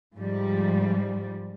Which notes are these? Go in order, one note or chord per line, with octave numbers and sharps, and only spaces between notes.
G#2 F3 G3